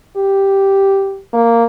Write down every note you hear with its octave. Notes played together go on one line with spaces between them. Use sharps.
G4
A#3